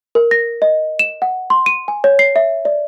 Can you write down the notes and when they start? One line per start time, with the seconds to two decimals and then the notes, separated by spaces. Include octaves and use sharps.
0.15 A#4
0.31 A#6
0.62 D#5
0.99 E7
1.22 F#5
1.50 C6
1.66 D#7
1.88 G#5
2.04 C#5
2.19 C7
2.36 E5
2.65 D5